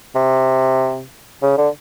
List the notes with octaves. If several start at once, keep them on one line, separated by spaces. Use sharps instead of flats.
C3
C#3
D3